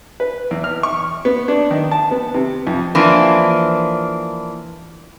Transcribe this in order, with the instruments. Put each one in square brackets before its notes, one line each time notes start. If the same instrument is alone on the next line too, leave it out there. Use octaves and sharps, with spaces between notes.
[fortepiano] B4
E2
F6
C#6
B3
D4
D#3
A5
B3
C3
F2
[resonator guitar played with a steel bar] E3 F3 A#3 D4